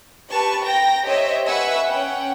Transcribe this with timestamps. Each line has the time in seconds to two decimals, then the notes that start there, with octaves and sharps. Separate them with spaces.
0.31 G4 B4 A5 C#6
0.64 G5 A#5 A#6
1.06 G4 C5 C#5 D#5 E5
1.47 B4 E5 F#5 G#5 C#6 E6
1.86 C#4 F#5 G5